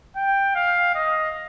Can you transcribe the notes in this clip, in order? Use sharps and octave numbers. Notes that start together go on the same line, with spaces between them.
G5
F5
D#5